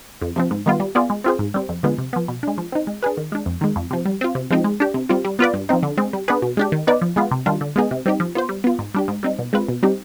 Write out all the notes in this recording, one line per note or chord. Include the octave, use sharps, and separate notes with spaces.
F2
C3 F3 C4
G#2
D#3 G3 B3 F4
G3
B3 F4 G#4 D5
G#3
C4 F4 G#4 C5
G#2
G3 C4
F2
D3 F3 G#3 B3
C3
F3 B3
B2
G#3 D4
F3
C4 D#4
G#3
D4 G#4 B4
D#3
G#3 D4
F2
D#3 G#3
F2
C3 F3
G3
C4 F4
C3
F3 G#3 C4 D#4
G#3
D4 G4
C3
G3 C4 F4
G3
B3 F4 B4 D5
G2
F3 C4 D#4
D3
G#3 C4
G3
B3 D4 G#4 B4
B2
G#3 D4 G4
D#3
B3 D#4 B4 D5
F3
G#3 B3 F4
C3
D#3 G3 D4 F4
D3
G#3 B3 D#4 G#4
C3
G3 C4 D#4 G4
F3
B3 F4 C5
G3
B3 F4
G#2
G3 D4 G4
G#2
G3 C4 D#4
B2
G#3 C4 F4 B4
B2
G3 C4 D#4 G4